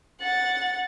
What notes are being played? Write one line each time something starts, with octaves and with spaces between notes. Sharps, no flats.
F#5 A6